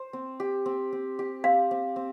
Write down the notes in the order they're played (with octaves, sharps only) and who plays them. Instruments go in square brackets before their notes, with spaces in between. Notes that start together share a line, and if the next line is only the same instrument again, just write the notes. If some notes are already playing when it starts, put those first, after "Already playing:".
Already playing: [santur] C5
C4
G4
C4
C4
G4
[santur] C4 [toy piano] F5
[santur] C4
C4